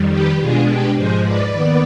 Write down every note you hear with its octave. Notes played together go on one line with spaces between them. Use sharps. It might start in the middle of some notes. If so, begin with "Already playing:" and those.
Already playing: F2 D#3 G3
G4 B4
B2 G#3 D4 F4 G#4
G4 B4
G#2 F3 G#3 G#4 C5
B4 D5
D#2 D#3 B3